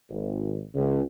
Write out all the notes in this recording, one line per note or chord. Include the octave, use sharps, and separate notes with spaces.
G#1
C#2